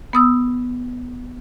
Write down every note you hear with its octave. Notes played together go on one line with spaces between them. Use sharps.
B3 D#6 E6